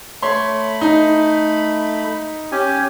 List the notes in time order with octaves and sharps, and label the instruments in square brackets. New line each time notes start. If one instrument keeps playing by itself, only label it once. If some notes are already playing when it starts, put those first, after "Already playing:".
[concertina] A3 B5 [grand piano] C#5 C6
[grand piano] D#4
[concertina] C#4 G4 G#5